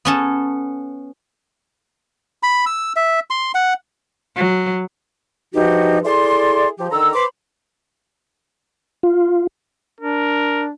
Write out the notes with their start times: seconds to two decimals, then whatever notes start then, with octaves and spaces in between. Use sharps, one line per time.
0.05 B3 C#4 A4
2.43 B5
2.66 E6
2.96 E5
3.30 C6
3.55 F#5
4.36 F#3
5.54 G2 E3 F3 D#4 F#4 G4
6.05 E4 G#4 A4 D5 C6
6.79 F3 G4
6.91 D3 D#3 A#5 E6
7.14 B4 C5 B5 C6 D6
9.03 F4
10.01 D4 A#4